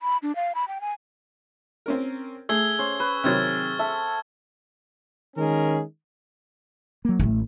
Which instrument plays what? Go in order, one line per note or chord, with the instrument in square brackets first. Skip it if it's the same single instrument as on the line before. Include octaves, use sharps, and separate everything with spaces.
[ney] B5
D4
F5
B5
G5
G#5
[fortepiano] C4 C#4 A#4
[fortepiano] A3 [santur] G#4 [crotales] E6 G#6 G7
[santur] C#4 C5
[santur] B4 [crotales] C#6
[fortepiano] C3 D#3 F#3 [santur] C4 [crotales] F6 G#6 A6
[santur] A4 [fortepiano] E5
[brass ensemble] D#3 G#3 C#4 G#4 A#4
[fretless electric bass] F#3 A#3
[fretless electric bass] A1 A2 [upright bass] G#3 A3